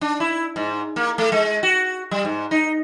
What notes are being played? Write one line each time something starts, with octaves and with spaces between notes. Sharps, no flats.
D4
E4
G#2
A#3
A3
G#3
F#4
G3
G#2
D#4